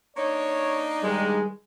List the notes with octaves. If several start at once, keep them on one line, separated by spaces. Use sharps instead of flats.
A#3 D4 D#4 C#5
G2 D#3 G3 G#3 G#4